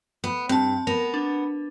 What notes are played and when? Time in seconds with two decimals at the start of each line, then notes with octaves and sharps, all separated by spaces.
0.24 B3
0.49 G2 C4 A5
0.87 B3 A#4
1.14 D4